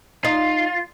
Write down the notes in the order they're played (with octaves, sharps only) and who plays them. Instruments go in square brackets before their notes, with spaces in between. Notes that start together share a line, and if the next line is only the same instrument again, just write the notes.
[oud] D#4 [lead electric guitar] F4